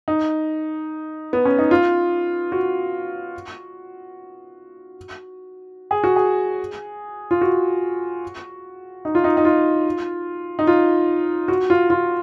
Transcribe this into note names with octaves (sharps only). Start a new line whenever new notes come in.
D#4
B3
C#4
D#4
F4
F#4
G#4
F#4
G#4
F4
F#4
D#4
F4
D#4
D#4
F4
D#4
F4
F#4
F4
F4